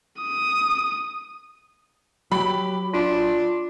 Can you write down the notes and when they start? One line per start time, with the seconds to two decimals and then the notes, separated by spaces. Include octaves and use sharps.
0.22 D#6
2.32 F#3 G4 B5
2.94 D4 F4